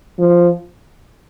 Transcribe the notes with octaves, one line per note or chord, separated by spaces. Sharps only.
F3